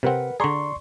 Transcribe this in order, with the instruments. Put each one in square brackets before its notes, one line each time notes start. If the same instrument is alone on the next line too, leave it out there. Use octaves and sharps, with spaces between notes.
[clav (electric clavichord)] C3 C4 [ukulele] A#4 B4 F#5
[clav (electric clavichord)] D3 G#4 [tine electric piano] D5 C6 C#6 [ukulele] A#5